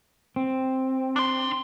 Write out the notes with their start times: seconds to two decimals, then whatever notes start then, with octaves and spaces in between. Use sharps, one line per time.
0.36 C4
1.16 D4 C6